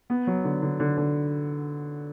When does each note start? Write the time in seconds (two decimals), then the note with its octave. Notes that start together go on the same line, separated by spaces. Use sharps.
0.10 B3
0.27 F#3
0.44 D3
0.62 D3
0.80 D3
0.97 D3